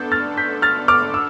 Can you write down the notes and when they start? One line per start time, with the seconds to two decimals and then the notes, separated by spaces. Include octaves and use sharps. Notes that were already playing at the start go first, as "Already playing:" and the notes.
Already playing: B3 D4 A4 G6
0.12 F6 A6
0.37 G6 B6
0.62 F6 A6
0.88 D6 F6
1.14 E6